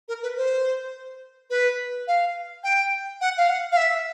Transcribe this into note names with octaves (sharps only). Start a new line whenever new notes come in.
A#4
B4
C5
B4
F5
G5
F#5
F5
F#5
F5
E5